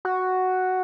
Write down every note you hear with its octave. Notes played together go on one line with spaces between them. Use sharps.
F#4